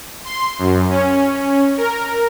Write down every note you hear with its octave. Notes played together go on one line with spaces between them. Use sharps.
C6
F#2
C#4
A#4